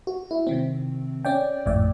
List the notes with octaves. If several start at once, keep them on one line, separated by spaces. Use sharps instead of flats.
F#4
E4
C3 D#3 C4
C#4 D5 G5
G#1 F2 A2 D5